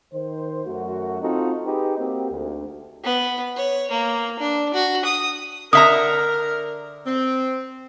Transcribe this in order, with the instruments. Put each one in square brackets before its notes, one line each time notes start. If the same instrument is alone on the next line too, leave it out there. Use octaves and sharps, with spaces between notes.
[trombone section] D#3 C5
F#2 A3 F#4
C4 D#4 F4 F#4 A4
D#4 G4 G#4 B4
A#3 C4 F#4 G4
D2
[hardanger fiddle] B3
C#5
A#3
D4
F#4
D#6
[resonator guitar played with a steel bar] D3 E5 A#5 [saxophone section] A#4 [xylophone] D#6
[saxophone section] C4